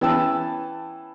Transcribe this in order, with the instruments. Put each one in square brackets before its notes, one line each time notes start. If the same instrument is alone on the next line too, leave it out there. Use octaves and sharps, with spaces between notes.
[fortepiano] E3 B3 C#4 G5 A5 E6